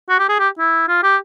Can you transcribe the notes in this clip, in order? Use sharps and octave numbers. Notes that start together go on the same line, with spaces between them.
F#4
G4
G#4
G4
E4
F4
G4